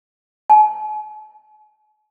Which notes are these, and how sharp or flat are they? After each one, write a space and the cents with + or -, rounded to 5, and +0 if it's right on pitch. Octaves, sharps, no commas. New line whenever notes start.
G#5 +45